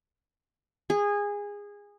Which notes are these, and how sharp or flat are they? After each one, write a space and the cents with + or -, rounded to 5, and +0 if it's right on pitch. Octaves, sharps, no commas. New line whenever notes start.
G#4 -20